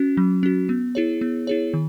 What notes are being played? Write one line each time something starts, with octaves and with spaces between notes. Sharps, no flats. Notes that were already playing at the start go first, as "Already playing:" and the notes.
Already playing: C#4 F#4
F#3
C#4 F#4
B3
E4 G#4 C#5
B3
E4 G#4 C#5
D#3